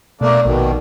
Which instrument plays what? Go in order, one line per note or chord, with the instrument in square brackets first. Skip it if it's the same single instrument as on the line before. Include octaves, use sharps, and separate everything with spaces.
[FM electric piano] B2 [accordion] A3 A#3 D4
[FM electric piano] A#1 [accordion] B2 D#3